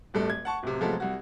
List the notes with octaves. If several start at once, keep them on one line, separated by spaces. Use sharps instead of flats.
D1 G2 A3
G#6
F#5 A5 C#6
D1 C3
C3 F3 F#3 G#3 A3 B3
C2 F#4